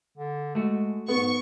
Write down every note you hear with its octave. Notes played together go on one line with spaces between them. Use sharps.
D3
G#3 A3 F#4
G#2 B3 C#6